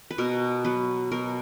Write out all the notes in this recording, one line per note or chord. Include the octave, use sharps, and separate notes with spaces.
B4
B2 A#4
F#3 B3 B4
B2 A#4